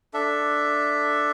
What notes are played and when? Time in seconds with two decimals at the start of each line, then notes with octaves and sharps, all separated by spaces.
0.14 D4 A4 E5